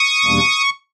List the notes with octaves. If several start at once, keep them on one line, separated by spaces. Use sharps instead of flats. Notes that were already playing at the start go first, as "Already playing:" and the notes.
Already playing: C#6 D#6
E2 B2 G3 A#3 D4